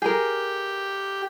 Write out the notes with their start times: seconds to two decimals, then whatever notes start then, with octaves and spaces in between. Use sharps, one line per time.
0.02 G4 G#4 A#4